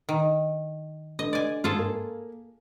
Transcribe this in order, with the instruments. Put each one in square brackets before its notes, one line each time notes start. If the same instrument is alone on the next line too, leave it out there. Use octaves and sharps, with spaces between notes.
[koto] D#3
[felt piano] D3 [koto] D#5
[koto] D5 G#5
[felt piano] G#2 [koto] F4 G#4 A4
[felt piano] A#3